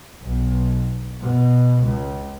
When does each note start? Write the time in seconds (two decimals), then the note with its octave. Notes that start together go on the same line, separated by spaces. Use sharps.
0.23 B1
1.22 B2
1.82 C#2